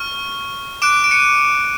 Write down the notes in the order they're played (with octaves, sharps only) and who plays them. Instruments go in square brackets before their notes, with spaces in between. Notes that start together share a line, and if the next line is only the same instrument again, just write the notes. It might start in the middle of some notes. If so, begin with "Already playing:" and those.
Already playing: [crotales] C#6 F6
D6 F#6 D7 E7
D7
C#7 D#7